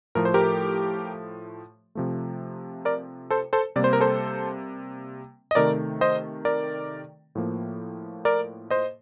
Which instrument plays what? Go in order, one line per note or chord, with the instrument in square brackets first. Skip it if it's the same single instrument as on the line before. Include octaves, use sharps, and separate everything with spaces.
[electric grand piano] A2 F3 A3 A#4
C5
G4 A#4
C3 F3 A3
A#4 D5
A4 C5
A4 C5
C3 G3 A#3 D5
C5
A#4
A4 C5
D#5
C3 D#3 A3 A#4 D5
C5 D#5
A#4 D5
A2 F3 A#3
A#4 D5
C5 D#5